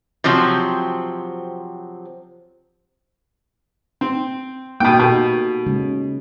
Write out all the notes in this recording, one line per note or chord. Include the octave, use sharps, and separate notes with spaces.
C3 F3 F#3 C4
C4
B2 A#3 B3 D#4 G5
B2 D#4 G4 A4
C#3 G#3 C#4